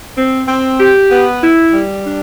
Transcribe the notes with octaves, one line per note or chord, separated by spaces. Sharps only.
C4
C4
G4
B3
E4
G3
D4